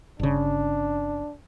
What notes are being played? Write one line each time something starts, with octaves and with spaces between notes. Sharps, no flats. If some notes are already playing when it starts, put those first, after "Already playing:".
G1 C#3 D4